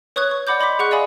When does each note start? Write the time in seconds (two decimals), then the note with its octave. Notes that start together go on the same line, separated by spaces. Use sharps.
0.16 B4 C#5 C#6 D#6 F#6 G#6
0.31 C#6
0.47 D5 F#5 B5 D6 G6
0.60 D#5 B5 C6 D6 B6
0.79 G#4 F#5 C#6 F#6
0.91 D5 D#5 F5 G#5 B5 D#6